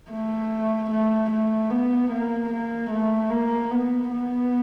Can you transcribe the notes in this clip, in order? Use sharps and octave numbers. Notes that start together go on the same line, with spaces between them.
A3
A3
A3
B3
A#3
A#3
A3
A#3
B3
B3